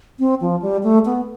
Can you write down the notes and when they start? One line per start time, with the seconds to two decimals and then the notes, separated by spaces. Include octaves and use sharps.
0.19 C4
0.41 F3
0.62 G3
0.83 A3
1.05 B3